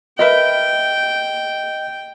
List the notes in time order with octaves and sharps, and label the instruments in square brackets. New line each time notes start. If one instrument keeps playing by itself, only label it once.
[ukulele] A#4 B4 E5 [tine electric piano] D#5 [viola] G5